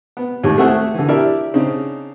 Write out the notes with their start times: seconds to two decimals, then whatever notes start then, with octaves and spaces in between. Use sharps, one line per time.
0.17 B3
0.43 D#2 A2 G#3
0.58 A3 C4 F#4 G#4 E5 F#5
0.94 D3 E3
1.08 D4 E4 G4 A#4 D5 E5
1.54 C#3 C4 D4 D#4